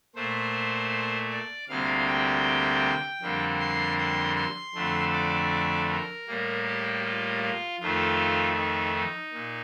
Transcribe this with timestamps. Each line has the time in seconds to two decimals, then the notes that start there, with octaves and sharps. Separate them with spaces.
0.15 A#2 A3 C5
1.30 D5
1.68 D2 C3 G3 A#3 F5
2.07 G5
3.21 F2 D3 G3 A#3
3.59 C6
3.98 C6
4.36 C6
4.75 F2 D3 A3
5.13 D5
5.89 A#4
6.27 A2 G3 A#3
6.66 G4
7.04 F4
7.42 F4
7.80 F2 D#3 A3 F4
8.57 D#4
8.95 D#4
9.33 A#2